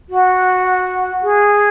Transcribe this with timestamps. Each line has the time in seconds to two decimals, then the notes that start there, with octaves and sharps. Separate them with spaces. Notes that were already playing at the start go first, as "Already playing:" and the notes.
0.10 F#4
1.23 G#4